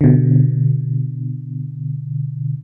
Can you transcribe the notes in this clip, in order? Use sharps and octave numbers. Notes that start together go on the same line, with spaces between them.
B2 D3